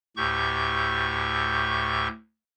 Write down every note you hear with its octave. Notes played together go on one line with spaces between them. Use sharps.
D2 A2 G4 C#6 G6